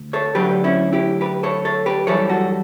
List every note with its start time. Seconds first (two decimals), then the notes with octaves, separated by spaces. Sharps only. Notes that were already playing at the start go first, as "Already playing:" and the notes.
Already playing: D2
0.13 A4 C#5
0.35 D2 D3 F#3 G4 B4
0.64 C#4 E4
0.93 E4 G4
1.21 G4 B4
1.43 A4 C#5
1.65 A4 C#5
1.86 G4 B4
2.07 F#2 E3 G3 A4 C#5
2.30 F#4 A4